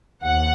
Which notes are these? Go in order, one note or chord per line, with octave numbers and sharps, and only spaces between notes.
D#2 F#5